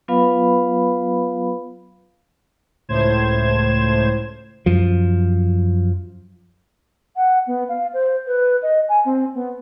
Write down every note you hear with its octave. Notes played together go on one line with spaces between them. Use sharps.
F#3 B3 F4 B4 F5 B5
C#2 A2 C5 G#6 E7
F#2 F3
F#5
B3
F5
C5
B4
D#5
G#5
C4
B3